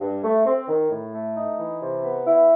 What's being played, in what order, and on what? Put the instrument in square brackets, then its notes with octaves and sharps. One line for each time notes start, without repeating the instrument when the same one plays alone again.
[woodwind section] G2
A3
C4
D#3
A2
A3
D#4
E3
C3
B3
E4